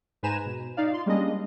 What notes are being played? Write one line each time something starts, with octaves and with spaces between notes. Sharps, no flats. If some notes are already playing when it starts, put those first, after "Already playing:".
G#2 B4 C5 G#5 A#5 E7
B2
D#4 D5 F5
F4 C6
G3 G#3 A#3 C#4 D4 D#5